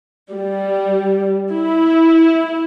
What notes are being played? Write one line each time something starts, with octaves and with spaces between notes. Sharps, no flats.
G3
E4